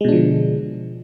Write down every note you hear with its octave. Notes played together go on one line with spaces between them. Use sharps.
B2 D3 F3 G#3 D4